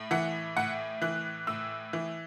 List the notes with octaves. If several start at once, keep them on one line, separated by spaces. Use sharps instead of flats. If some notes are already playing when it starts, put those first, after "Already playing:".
Already playing: A2
E3 F#5
A2 F#5
E3 F#6
A2 E6
E3